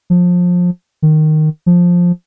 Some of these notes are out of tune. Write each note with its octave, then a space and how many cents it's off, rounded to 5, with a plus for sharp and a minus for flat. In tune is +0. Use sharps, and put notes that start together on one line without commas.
F3 +25
D#3 -10
F3 +10